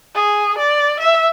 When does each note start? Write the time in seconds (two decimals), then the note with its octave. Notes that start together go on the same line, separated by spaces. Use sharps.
0.15 G#4
0.58 D5
1.00 E5